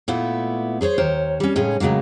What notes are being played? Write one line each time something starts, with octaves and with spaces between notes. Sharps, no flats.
A#2 A3 B3 E4
G#4 A4 C5 C#5
D#2 A#4 C5 C#5
G3 C#4
A2 C#3 G#3 C#4 D#4
A2 C#3 F#3 G#3 A#3